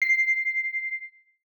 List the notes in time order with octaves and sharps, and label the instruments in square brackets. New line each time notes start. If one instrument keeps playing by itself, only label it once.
[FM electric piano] C7